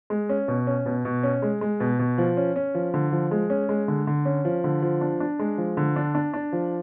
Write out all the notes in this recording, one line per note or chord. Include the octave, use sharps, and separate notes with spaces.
G#3
C#4
B2
C#4
B2
B2
C#4
G#3
G#3
B2
B2
F3
C#4
C#4
F3
D3
F3
G#3
C#4
G#3
D3
D3
C#4
F3
D3
F3
D4
D4
G#3
F3
D3
D4
D4
D4
F3